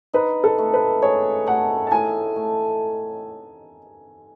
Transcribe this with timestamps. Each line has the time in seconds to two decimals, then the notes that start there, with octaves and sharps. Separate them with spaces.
0.13 D#4 B4
0.44 A4
0.58 A3
0.74 B4
1.02 G#4 C#5
1.47 A3 F#5
1.87 A5
1.91 A2 G#5
2.36 A3